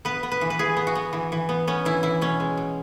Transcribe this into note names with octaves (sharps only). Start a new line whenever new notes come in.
B3 B4
B3
B4
E3
B4
E3 G#4
B3
F#4
B3
E3
E3
B3
B3 C#4
E3 E4
E3 E4
B2 C#4
G#3
B2